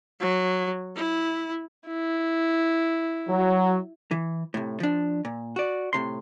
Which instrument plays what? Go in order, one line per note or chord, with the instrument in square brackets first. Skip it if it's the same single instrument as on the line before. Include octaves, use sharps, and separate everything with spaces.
[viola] F#3
E4
[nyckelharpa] E4
[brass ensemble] F#3
[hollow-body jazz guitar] E3
A2 C3
F3 D4
A#2
F#4 D5
A2 C3 C6